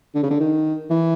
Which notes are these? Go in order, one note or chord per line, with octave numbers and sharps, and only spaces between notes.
D3
C#3
D3
D#3
E3